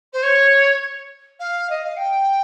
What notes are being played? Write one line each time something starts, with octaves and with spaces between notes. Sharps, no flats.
C5
C#5
F5
D#5
F5
G5